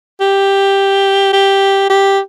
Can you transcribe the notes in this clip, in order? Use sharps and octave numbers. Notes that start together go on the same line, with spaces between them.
G4
G4
G4